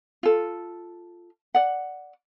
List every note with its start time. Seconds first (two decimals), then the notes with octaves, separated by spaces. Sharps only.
0.23 F4 A4
1.54 D5 F#5